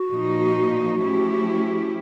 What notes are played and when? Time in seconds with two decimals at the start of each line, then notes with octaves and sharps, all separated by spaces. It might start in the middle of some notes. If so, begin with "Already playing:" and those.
Already playing: F#4
0.10 A#2 F3 A#3 D#4
0.99 F3 A3 C#4 E4 G4